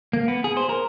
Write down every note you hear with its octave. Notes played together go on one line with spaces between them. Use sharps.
A#3
B3
G#4
C5
A#4